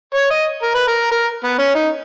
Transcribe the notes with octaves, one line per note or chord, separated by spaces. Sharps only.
C#5
D#5
A#4
B4
A#4
A#4
B3
C#4
D#4